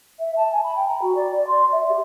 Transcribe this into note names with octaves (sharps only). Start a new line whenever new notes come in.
E5
A5
G#5
B5
G5
A#5
F#4
D5
D5
C6
E5
G4